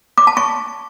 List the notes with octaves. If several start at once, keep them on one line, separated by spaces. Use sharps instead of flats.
D6
A5
C#6